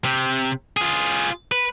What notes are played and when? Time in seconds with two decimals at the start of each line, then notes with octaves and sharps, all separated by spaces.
0.05 C3
0.77 F4 G#4
1.52 B4